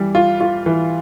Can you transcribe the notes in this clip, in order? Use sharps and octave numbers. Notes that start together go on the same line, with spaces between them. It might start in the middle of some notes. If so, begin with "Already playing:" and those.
Already playing: E3 G3
F4
F4
E3